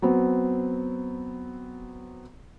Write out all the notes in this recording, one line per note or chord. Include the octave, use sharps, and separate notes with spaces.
F#3 B3 C4